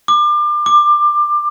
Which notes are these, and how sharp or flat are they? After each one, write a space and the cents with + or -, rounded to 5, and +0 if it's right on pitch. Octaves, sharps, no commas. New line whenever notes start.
D6 +30
D6 +20